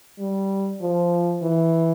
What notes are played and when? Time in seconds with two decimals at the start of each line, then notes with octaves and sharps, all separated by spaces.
0.19 G3
0.81 F3
1.42 E3